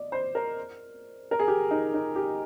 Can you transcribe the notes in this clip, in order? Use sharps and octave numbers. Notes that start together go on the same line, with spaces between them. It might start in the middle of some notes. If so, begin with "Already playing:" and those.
Already playing: D5 D#5
C5
A#4
A#4
G#4
G4
D#4
D#4
G4